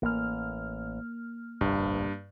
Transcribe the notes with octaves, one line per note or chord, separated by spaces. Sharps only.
A1 A#3 F6
F1 A#1 G2 D3